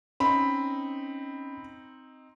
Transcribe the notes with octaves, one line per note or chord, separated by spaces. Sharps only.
C4 C#4 D#4 D#5 B5